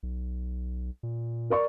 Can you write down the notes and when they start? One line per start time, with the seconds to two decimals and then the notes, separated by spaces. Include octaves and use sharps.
0.03 B1
1.03 A#2
1.50 A#4 D5 C#6